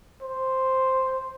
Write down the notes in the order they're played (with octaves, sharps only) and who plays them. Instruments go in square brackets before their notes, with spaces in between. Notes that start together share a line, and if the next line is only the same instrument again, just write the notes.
[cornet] C5